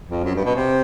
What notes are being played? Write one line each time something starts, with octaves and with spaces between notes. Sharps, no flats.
F2
F#2
G2
B2
C3